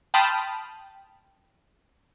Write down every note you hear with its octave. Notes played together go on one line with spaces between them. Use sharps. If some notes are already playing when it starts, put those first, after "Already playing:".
G5 A5 B5 C6 D#6 F6